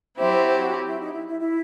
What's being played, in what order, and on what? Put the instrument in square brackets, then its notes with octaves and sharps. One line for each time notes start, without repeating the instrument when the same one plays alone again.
[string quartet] F#3 C4 E4 G4 [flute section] C5 E5
[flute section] C5
C5
F#4
E4
D#4
E4
E4
E4